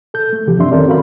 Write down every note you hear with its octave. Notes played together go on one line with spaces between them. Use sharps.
A4 G6
A3
C3 E3 F3 G4
F#2 C4 D4 E5 C6
D#3 C4 C#4 A4 A#4 D5
F#4 A#4 F5 B5